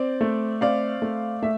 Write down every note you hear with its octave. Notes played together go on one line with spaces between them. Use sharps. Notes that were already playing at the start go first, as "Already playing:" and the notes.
Already playing: C4 D5
A3
C4 D5 F5
A3
A3 E5